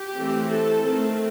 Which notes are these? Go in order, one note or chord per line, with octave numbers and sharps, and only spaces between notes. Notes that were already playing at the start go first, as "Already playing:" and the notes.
Already playing: G4
E3 A3 C4
A4
D#3 A3 C4